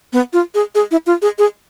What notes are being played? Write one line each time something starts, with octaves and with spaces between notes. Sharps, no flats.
B3
F4
G#4
G#4
E4
F4
G#4
G#4